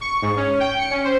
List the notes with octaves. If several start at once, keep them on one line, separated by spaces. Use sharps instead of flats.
C#6
G#2
C#4
G5
C#7
C#4
C5